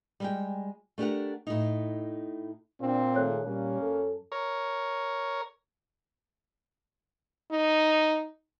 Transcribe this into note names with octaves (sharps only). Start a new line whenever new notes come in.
G3 G#3 G5
A3 D4 G4 A#4 F#5
A2 D#4
A#2 C4 D4
D#3 A3 G#4 C#5 F#6
A#2 G3 A#3 C#4
F#2 A4
A#4 C#5
D#4